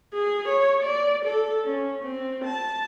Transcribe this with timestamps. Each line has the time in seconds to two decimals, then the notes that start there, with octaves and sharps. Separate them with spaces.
0.14 G#4
0.48 C#5
0.83 D5
1.25 A4
1.64 C#4
2.04 C4
2.44 A5